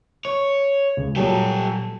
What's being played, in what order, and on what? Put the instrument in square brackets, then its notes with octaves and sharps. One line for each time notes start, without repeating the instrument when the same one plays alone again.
[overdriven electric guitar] C#5
[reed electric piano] C#2 C#3
[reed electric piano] A#2 F#3 G3 [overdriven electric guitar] G4 A4